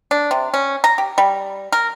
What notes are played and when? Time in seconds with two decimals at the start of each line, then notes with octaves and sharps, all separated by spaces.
0.11 D4
0.31 C3
0.54 C#4
0.84 A#5
0.98 G4
1.18 G3
1.72 A#4